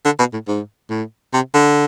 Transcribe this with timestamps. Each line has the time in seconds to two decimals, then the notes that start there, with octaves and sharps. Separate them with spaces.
0.05 D3
0.19 B2
0.33 A2
0.47 G#2
0.90 A2
1.33 C3
1.54 D3